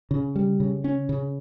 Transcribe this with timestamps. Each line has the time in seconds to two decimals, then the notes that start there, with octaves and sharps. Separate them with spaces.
0.11 C#3
0.35 G3
0.60 C#3
0.84 C#4
1.09 C#3